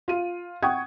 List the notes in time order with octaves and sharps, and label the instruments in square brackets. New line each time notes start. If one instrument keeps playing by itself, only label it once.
[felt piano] F4 D#7
F#5 G5 C#6 D#6 G#6